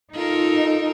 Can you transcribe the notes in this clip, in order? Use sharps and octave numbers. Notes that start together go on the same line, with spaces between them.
D#4 F4 A4 A#4